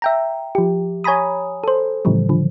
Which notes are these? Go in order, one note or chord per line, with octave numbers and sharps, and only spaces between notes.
E5 G5 A#5
F3 G4
C#5 G#5 A#5 B5 D#6
A4 C5
A2 C#3 E3 F3 G3
D3 F3